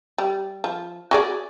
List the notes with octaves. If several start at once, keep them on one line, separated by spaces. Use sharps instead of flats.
G3
F3
F#4 G#4 D5